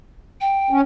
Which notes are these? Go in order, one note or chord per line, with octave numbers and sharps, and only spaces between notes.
G5
C#4